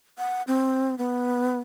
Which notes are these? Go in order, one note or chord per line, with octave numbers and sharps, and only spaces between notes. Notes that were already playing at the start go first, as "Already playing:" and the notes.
F#5
C4
B3